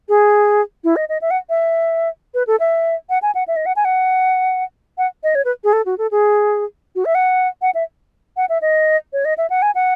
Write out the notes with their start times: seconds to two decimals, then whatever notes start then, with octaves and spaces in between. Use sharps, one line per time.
0.09 G#4
0.84 E4
0.96 D#5
1.09 D#5
1.22 E5
1.31 F#5
1.49 E5
2.34 B4
2.47 A4
2.60 E5
3.10 F#5
3.22 G#5
3.35 F#5
3.48 E5
3.56 D#5
3.66 F#5
3.76 G#5
3.85 F#5
4.98 F#5
5.24 D#5
5.35 C#5
5.45 B4
5.64 G#4
5.73 A4
5.86 F#4
5.98 A4
6.11 G#4
6.95 F#4
7.05 E5
7.15 F#5
7.62 F#5
7.75 E5
8.37 F#5
8.49 E5
8.62 D#5
9.13 C#5
9.25 D#5
9.38 E5
9.50 F#5
9.62 G#5
9.75 F#5